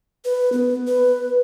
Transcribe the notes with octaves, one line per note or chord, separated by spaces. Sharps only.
B4
B3
B4